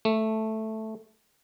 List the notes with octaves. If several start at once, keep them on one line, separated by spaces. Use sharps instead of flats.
A3